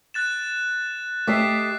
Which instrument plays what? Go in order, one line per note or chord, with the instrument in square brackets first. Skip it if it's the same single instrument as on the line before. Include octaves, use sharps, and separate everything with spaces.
[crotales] F#6 A6 E7
[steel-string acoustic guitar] A3 G4 D#5 [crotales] D6 B6 C7